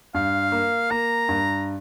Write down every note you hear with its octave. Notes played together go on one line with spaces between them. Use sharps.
G2 F5
A#3
A#3 A#5
G2